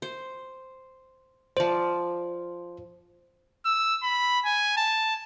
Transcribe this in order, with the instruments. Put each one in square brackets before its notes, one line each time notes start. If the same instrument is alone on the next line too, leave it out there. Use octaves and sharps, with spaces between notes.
[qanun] C5
[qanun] F3 D5 [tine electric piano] C5
[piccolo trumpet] E6
B5
G#5
A5